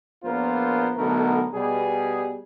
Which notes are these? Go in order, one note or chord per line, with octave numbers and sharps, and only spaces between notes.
A#1 A#2 B3 F4 A#4 C5
B1 B2 D3 A3 B3 A#4
B2 G3 G#4